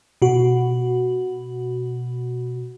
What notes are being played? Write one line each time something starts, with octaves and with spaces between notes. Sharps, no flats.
B2 F#4